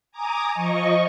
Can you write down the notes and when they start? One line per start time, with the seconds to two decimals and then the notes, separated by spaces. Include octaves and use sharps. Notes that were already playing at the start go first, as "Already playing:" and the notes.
0.12 G#5 A#5 D6 D#6
0.51 F3 D#5 C#6